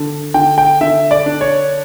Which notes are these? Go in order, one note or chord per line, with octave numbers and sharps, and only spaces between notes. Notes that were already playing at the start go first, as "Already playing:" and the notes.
Already playing: D3
D3 G5
G5
D3 E5
D5
D4
C#5